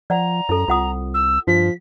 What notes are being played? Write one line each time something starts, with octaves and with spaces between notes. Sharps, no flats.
F3 D5 F#5 A#5
F#2 E4 A4
C2 F4 F#5 D#6
E6
G2 F3 B6